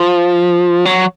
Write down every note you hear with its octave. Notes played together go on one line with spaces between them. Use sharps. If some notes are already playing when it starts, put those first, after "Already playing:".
Already playing: F3
F#3